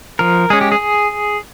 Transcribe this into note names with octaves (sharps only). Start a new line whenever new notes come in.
F3 A#4
G#3 C#4 G#4
G4
G#4